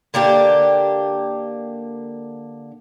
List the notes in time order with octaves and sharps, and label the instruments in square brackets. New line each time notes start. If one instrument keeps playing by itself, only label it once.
[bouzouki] D3 A#3 D4 G4